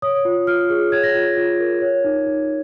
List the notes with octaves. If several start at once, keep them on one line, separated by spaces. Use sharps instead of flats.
C#5 D#6
F4
F4 F6
G#4
C#5 G#6
A#6
F4 G#6
F4
A#4
C#5
D#4
D#4